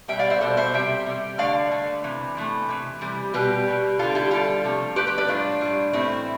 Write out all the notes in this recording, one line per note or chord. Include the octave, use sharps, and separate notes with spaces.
B2 G3 E5 G5
D5 F5
C5 E5
B2 G3 A4 C5
C5 E5
C3 G3 E5 G5
C3 G3
D3 A3 D5 F5
D3 A3
C3 E3
C3 E3 A3
C3 E3
C3 E3 G3
B2 G3 G4 B4
B2 G3
D3 G3 F4 A4
E4 G4
D3 G3 F4 A4
C3 F3 A3
C3 F3 A3 G4 B4
G4 B4
B4 D5
A2 G3 D4 F4
A2 G3
A2 E3 A3 C4 E4